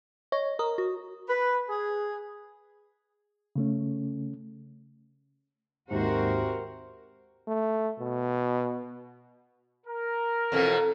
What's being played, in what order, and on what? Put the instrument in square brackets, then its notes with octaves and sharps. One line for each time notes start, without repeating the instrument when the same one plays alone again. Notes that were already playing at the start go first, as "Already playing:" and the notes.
[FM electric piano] C#5 [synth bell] D#5
[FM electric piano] A#4 [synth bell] D#6
[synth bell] F#4
[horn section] B4
G#4
[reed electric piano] C#3 A3 C#4
[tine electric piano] D#2 G#2 [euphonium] C3 [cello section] F#4 A#4 C5
[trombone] A3
B2
[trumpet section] A#4
[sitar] F2 B2 E3 [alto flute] A4